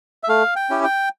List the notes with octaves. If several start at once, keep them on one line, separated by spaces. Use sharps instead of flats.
E5
A3 F5
G5
C#4 E4 G4
G5